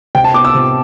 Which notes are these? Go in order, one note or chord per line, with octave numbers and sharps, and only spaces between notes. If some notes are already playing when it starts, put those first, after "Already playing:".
C3 G5
A5
B3 D6
E6
C3